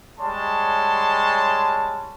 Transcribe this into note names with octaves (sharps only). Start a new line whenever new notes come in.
G3 G#3 C#5 A5 C6